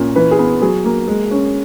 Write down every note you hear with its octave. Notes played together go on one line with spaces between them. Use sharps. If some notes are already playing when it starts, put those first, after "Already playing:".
Already playing: A#2 C#4
E3 B4
G#4
B3
F#3 G#4
A#3
G#3
C#4